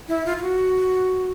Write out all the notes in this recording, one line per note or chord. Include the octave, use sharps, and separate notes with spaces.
E4
F4
F4
F#4